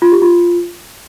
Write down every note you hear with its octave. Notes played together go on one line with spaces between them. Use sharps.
F4
G4
F4